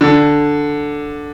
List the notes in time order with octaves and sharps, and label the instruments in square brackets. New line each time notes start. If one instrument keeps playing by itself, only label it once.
[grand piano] D3